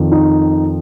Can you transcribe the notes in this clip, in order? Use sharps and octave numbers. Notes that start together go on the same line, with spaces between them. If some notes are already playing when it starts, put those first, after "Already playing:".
Already playing: F2 D#3
D#4